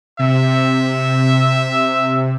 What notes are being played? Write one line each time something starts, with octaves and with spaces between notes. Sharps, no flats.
C3 E5